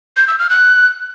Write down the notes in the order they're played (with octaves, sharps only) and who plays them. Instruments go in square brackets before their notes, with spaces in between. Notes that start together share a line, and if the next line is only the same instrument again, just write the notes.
[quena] G6
E6
F6
F#6